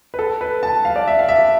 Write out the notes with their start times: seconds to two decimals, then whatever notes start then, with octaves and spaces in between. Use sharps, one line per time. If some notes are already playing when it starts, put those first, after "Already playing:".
0.14 B4
0.19 A4
0.41 B4
0.63 A5
0.85 F5
0.96 D5
1.07 E5
1.19 F5
1.29 E5